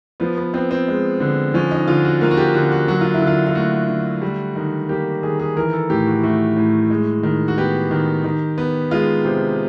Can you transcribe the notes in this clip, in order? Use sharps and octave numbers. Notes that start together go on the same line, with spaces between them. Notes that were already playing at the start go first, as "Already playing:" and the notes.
F3 B3
B3
B3 C4
C4
G#3
D3
F3 C#4
D#4
D3 F4
F#4
A#3 F4
F#4
G4
D3 F#4
F#4
F#3 F#4
F4
E4
D3
F4
F4
A3 F#4
D3
G3
D#3
A#3 G4
D#3 G#4
G#4
E3 A#4
A4
A2 G4
F#4
A3 F#4
A2
G#3
D#3
F#4
B3 G4
D#3
D#3
B3
G#3 F4
C3